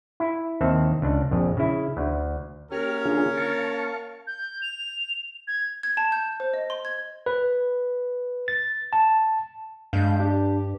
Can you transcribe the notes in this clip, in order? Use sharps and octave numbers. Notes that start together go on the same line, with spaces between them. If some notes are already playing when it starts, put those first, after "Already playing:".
E4
D#2 D#3 C4 E5 A5
C#2 D4
A#1 F2
C#3 E4
D2
A#3 C#4 G4 A#4 F6
D3 F4 G#4
F5 A5 C#6
G6
F7
G#6
G#6
A5
G6
C5
D#5
C6
G#6
B4
A6
A5
G2 G#3 F5 G6
D4 G4